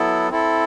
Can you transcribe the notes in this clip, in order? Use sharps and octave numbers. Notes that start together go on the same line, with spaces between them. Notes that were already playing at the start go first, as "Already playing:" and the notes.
Already playing: F#3 B3 E4 A4
C4 E4 A4